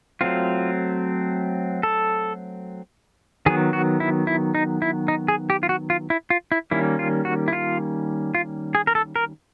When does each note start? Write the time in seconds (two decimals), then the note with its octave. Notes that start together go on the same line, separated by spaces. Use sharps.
0.21 F#3 A3 C4 F4
1.83 A4
3.46 D#3 F#3 B3 G#4
3.73 F#4
4.00 E4
4.27 E4
4.55 D#4
4.82 E4
5.08 D#4
5.28 G#4
5.50 G4
5.63 F4
5.69 F#4
5.90 F4
6.10 E4
6.30 F4
6.52 E4
6.71 D#3 G3 A#3 C#4 E4
6.99 F4
7.25 F#4
7.48 E4
7.53 F4
8.35 F4
8.75 G#4
8.87 A#4
8.95 A4
9.16 A#4